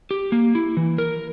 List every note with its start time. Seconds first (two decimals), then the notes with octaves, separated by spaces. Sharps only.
0.11 G4
0.32 A#3
0.55 E4
0.77 E3
0.98 A#4